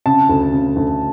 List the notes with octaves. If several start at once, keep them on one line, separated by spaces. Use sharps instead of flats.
C#3 A5
D2
C#3
D2